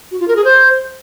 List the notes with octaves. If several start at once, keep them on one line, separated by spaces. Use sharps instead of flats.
F#4
F4
A#4
G#4
C5